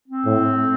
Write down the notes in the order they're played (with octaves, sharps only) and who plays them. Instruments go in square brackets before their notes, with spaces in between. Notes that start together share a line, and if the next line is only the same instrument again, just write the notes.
[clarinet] C4
[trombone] A2